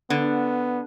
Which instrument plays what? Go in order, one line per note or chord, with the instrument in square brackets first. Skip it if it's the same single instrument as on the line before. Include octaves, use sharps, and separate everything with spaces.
[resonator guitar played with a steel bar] D3 [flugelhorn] B3